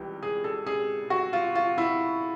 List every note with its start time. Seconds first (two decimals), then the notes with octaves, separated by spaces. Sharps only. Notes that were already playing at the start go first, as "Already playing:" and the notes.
Already playing: C#2 E3 G3 G4
0.23 G#4
0.44 A4
0.67 G#4
1.10 F#4
1.33 F4
1.55 F4
1.78 E4